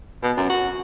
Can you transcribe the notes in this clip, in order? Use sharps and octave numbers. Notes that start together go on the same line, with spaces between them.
B2
F#2
F#4